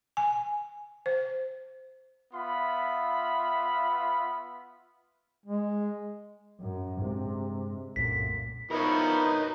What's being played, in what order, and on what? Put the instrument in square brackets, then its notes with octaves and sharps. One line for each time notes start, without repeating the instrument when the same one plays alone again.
[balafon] G#5
C5
[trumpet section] B3 F4 E5 B5
[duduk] G#3
[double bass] F#2
[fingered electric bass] G2 G#3 [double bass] C3
[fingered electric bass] C2 F#2 A3 [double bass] A#2 [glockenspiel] B6
[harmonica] F3 B3 E4 [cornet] D#4 [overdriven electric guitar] A#4 C#5